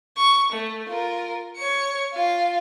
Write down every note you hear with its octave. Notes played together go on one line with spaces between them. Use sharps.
C#6
A3
F4 A#4
C#5 C#7
F4 F5